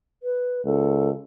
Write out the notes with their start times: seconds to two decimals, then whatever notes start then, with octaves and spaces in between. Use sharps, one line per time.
0.23 B4
0.65 C#2 A4